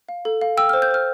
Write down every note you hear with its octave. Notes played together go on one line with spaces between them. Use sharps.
F5
A4
F5
G5 E6
C5 F6
G6
C5 F6